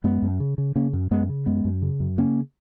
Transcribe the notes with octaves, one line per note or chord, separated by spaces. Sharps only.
F#2 G#3 B3
F#2
C#3
C#3
C#3 A#3 C#4
F#2
F#2 G#3 B3
C#3
F#2 G#3 B3
F#2
C#3
F#2
C#3 A#3 C#4